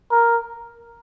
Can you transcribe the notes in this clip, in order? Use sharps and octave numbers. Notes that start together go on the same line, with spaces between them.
A#4